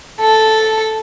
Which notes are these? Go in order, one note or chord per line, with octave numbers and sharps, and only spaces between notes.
A4